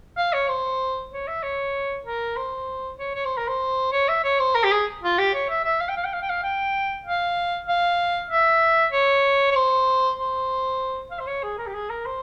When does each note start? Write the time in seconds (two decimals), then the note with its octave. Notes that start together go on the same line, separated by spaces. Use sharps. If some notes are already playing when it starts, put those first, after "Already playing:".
0.18 F5
0.33 C#5
0.49 C5
1.12 C#5
1.28 E5
1.43 C#5
2.05 A#4
2.37 C5
2.99 C#5
3.15 C#5
3.25 C5
3.37 A#4
3.48 C5
3.92 C#5
4.08 E5
4.24 C#5
4.40 C5
4.55 A#4
4.64 G4
4.72 G#4
5.02 F4
5.18 G4
5.34 C#5
5.49 E5
5.65 E5
5.81 F5
5.89 G5
5.97 F5
6.05 G5
6.13 F5
6.22 G5
6.30 F5
6.43 G5
7.05 F5
7.68 F5
8.30 E5
8.92 C#5
9.51 C#5
9.55 C5
10.18 C5
11.11 F5
11.20 C5
11.27 C#5
11.43 G#4
11.58 A#4
11.67 G4
11.74 G#4
11.90 A#4
12.06 C5